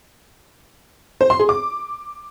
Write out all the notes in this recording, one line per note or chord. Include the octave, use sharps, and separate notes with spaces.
C5
C6
G#4
D6